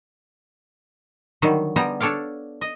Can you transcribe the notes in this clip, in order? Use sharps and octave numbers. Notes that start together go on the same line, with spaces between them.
D3 D#3 F#3 G3
D3 G3 B3 G4 G#4 A#5
D4 A4 C#5 D5 F5
D#5